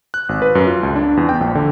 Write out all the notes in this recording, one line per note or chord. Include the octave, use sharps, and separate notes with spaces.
F#6
G#1
B4
F#2
F4
C#2
D4
E2
G5
A#1
D3